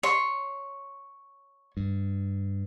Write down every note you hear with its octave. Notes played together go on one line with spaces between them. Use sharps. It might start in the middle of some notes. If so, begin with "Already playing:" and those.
C#5 C6
G2